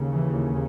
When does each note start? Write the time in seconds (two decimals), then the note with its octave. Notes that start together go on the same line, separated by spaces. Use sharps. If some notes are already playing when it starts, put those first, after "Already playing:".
Already playing: D#2 C#3
0.14 E3